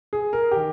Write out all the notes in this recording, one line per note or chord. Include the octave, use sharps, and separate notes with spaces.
G#4
A#4
D#3 G4